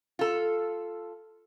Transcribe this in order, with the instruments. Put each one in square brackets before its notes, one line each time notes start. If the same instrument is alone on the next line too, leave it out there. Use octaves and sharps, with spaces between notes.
[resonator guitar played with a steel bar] F4 A4